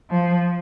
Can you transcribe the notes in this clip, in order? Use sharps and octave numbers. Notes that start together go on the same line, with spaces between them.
F3